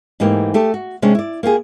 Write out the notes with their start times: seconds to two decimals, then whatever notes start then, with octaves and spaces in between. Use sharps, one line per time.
0.20 G#2 E3 A3 A#3 G4
0.54 A3 G4 A4
0.74 F#4
1.02 C3 G#3 C#4 D4
1.15 E4 D5
1.43 A#3 F4 G4 G#4